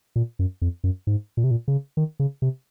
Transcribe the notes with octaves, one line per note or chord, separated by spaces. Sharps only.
A#2
F#2
F2
F#2
G#2
A#2
C3
A#2
C#3
D#3
C#3
C3